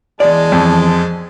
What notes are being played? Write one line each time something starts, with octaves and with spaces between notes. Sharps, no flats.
E2 G#3 D5 A5
F2